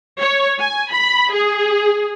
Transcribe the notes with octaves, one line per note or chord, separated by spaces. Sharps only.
C#5
G#5
B5
G#4